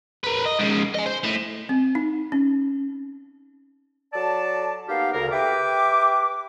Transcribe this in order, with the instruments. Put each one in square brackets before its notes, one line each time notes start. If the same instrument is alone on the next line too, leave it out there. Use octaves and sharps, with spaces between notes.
[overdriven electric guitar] A#4 B4
D#5
G#2 C#3
D#5 G#5
C5
A2
[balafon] C4
D#4
C#4
[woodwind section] F#3 A4 D5 A5
A#3 B3 D#4 G4 F5
D2 C#3 A#4
G4 B4 E5 G5 D6